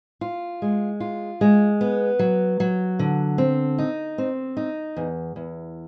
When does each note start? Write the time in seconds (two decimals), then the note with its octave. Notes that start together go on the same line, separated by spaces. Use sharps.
0.21 F4
0.62 G#3
1.00 F4
1.41 G#3
1.81 B3
2.19 F#3
2.60 F#3
2.99 D3
3.38 C4
3.78 D#4
4.18 C4
4.57 D#4
4.97 E2
5.36 E2